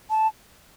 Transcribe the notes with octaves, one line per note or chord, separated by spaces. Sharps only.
A5